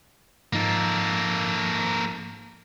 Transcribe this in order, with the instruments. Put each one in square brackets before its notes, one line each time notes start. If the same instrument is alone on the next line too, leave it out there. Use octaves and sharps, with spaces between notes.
[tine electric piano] G#2 F3 D#4 [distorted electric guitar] A#3 A4